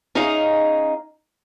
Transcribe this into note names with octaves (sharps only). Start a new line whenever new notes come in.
C#4 D#4 G#4 D#5 F5 A#5